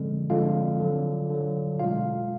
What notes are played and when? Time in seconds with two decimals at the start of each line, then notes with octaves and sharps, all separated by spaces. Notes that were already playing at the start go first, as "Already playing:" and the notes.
Already playing: D3 F3 G#3 C4
0.30 D3 F3 G#3 F4 F5
0.80 D3 F#3
1.30 D3 F#3
1.79 B2 G#3 F4 F5